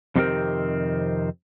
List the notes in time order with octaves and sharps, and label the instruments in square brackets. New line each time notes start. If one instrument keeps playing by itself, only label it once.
[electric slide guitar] F2 C3 D#3 C4 G4 A#4